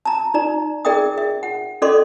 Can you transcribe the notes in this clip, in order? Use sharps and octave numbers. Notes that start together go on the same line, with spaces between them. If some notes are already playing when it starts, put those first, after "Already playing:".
A5 A#5
D#4 D5 A#5
G#4 A#4 D5 E5 G5 D#6
E5
F#5
C#4 A4 D5 D#5 C6 D6